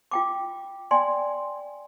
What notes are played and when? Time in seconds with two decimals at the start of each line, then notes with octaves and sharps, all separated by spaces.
0.11 F4 G5 D6
0.91 D5 G5 G#5 C6